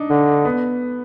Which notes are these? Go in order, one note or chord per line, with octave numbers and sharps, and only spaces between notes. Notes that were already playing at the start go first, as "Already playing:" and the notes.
Already playing: D4 D#4
D3
B3